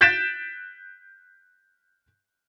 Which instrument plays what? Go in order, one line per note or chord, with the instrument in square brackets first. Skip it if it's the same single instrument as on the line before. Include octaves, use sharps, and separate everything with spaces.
[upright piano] F#6 G6 A6 B6 D7 E7